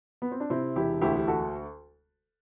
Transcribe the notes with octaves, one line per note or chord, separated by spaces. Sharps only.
B3
C4
D4
C3 C4 E4
E1 E4 G4
D2 E4 G4
G4
F#4 A4